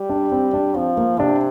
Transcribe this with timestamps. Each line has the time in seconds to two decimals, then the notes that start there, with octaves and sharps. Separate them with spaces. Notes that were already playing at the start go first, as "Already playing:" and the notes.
Already playing: G3
0.10 D4
0.32 C4
0.54 D4
0.76 F3 C4
0.97 A#3
1.20 C3 D4